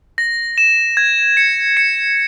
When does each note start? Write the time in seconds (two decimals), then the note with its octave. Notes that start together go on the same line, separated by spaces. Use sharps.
0.18 A#6
0.58 E7
0.97 G#6
1.37 C#7
1.77 C#7